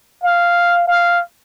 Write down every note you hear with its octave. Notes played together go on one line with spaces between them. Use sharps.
F5
F5